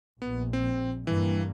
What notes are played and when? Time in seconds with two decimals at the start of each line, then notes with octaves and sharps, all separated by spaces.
0.22 A#1 B3
0.53 C4
1.07 G2 E3 A#3